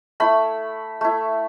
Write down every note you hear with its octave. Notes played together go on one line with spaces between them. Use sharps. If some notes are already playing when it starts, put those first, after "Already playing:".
A3 E4 B5
A3 E4